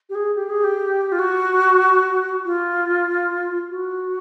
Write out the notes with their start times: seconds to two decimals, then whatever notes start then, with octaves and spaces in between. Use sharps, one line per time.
0.10 G4
0.15 G#4
0.35 G4
0.49 G#4
0.64 G4
1.12 F4
1.19 F#4
2.45 F4
3.70 F#4